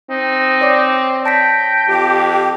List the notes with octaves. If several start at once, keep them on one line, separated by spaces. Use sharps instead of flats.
C4 D#4
C#5 D5 D6
G5 A5 A#6 B6
F2 G4